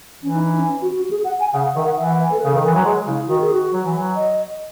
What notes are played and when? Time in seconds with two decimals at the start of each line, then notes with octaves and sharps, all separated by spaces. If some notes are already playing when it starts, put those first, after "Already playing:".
0.23 E3 C#4
0.34 D#4
0.45 D#4
0.56 C#4
0.66 C#4
0.82 F#4
0.96 F#4
1.11 G#4
1.24 F#5
1.40 G#5
1.53 C#3 F#5
1.65 F#5
1.76 D#3 E5
1.86 F#5
1.98 E3 E5
2.09 F#5
2.20 B4
2.31 A4
2.39 B4
2.45 C#3 A4
2.54 D#3
2.65 E3
2.75 F#3
2.85 G#3 G#4
3.07 C#3 E4
3.28 D#3 F#4
3.41 G#4
3.52 F#4
3.72 F#3
3.85 E3
3.97 F#3
4.16 D#5